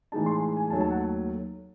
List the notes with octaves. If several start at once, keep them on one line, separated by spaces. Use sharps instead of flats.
A2 E3 G#3 D#4 A5
C6
A5
G#5
D#2 D#3 F#3 A3 A5
A5
F#5